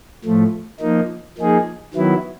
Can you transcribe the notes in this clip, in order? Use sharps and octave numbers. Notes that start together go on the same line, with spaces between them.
A2 F3 A3
F3 A#3 D#4
F3 A#3 D#4 G#4
D#3 F#3 B3 E4